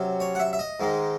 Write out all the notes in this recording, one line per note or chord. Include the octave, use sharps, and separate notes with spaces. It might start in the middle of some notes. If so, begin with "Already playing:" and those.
Already playing: C3 F#3 C#4
C#5
F#5
E5
E5
D#5
G#2 D#3 G#3